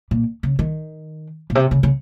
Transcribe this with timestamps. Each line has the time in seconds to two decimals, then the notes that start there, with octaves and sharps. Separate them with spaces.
0.11 A#2
0.43 C#3
0.59 D#3
1.50 A#2
1.55 C3
1.71 C#3
1.83 C#3